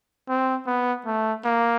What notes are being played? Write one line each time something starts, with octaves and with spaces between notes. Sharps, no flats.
C4
B3
A3
A#3